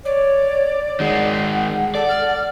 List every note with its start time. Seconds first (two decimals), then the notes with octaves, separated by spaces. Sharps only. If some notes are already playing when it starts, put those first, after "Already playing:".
0.05 C#5 D5
1.00 D#3 G#3 F#5
1.95 A4 D5
2.08 F6